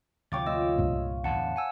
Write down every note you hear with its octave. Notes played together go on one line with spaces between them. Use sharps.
D2 C3 F3 C#5 F5 G5 D6 A6
A3 F4 D#5 E6
C2 G2 A#2
E2 A2 D3 F#5 A5
F#5 G#5 E6